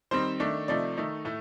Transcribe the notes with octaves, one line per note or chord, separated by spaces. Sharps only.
D#3 G3 C4 D#4 C5
D#3 A3 D4
C3 F3 A3 D#4 D5
D#3 A3 D#4
A2 A3